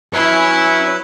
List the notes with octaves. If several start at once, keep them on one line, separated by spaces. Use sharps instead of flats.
F#3 E4 B4 C#5 E5 G#5